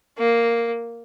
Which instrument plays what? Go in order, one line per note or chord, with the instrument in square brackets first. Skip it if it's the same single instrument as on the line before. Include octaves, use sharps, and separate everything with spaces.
[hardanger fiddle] A#3